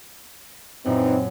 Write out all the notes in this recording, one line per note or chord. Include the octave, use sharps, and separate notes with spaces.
F#2 A#2 E3 C4 D#4